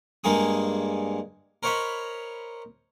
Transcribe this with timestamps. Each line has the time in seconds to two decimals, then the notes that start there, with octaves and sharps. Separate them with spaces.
0.24 G2 G#3 A#3 G#4 D#6
1.63 A#4 C5 C#5 D#5 B5